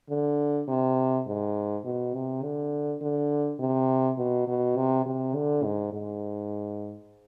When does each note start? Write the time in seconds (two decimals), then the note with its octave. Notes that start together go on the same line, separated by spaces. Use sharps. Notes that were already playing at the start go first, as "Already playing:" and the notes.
0.10 D3
0.69 C3
1.27 G#2
1.85 B2
2.14 C3
2.43 D3
3.02 D3
3.60 C3
4.18 B2
4.48 B2
4.77 C3
5.06 C3
5.35 D3
5.64 G#2
5.93 G#2